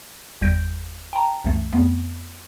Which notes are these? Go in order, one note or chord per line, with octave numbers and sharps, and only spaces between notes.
G1 E2 G3 G6 A#6 D7
G5 A5 A#5
C2 F#2 E3 A3
F2 A3 B3 C4